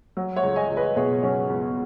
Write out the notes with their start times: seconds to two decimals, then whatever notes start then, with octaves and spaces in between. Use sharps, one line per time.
0.17 F#3
0.36 C#5 F#5
0.43 C#2
0.56 D#5 G#5
0.70 C#2
0.76 B4 D#5
0.96 B2 G#4 C#5
1.23 F#3 C#4
1.50 C#2 B3